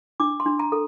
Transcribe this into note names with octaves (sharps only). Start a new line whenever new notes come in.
D4 D6
C6
D4
A#5
A4